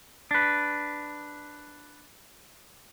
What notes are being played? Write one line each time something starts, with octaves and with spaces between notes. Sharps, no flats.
D4 B4